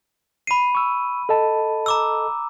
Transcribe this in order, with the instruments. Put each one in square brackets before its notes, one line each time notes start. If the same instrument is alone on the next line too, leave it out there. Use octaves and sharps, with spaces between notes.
[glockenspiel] B5 D#7 [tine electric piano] C7
[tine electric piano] C#6 E6
A4 D#5 A5
[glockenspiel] A#5 D6 E6